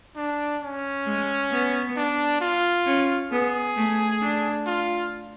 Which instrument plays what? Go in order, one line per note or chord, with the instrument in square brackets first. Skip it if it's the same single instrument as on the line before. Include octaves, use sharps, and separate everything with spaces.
[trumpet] D4
C#4
[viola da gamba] G#3
B3
[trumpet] D4
F4
[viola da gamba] C#4
[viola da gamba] B3 [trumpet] G#4
[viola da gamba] A3
D4
[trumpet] F4